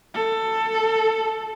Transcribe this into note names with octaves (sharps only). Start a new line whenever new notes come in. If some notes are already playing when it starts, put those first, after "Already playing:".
A4